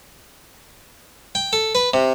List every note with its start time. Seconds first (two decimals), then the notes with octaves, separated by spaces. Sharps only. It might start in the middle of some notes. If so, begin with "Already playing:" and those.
1.35 G5
1.53 A4
1.75 B4
1.94 C3